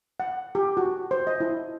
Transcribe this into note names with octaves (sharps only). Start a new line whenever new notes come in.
F#5
G4
F#4
C5
D#5
E4